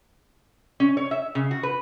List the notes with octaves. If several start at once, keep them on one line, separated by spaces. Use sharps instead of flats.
C#4
C#5
E5
C#3
F#4
B4